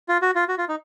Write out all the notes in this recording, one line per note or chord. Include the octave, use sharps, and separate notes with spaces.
F4
F#4
F4
F#4
F4
D#4